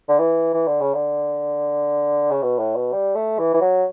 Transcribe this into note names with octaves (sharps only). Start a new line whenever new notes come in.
D3
E3
E3
D3
C#3
D3
C#3
B2
A2
B2
G3
A3
E3
E3
F#3